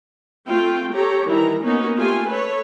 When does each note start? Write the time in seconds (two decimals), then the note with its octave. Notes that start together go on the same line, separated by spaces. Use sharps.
0.48 A3 C4 F4 G5
0.93 G4 A4 C#5 A#5
1.27 D#3 E3 G3 E4 A#4 A#5
1.62 A#3 B3 C#4 D#4 F#4 C#5
1.97 A3 F4 G4 G#5
2.28 A4 B4 C#5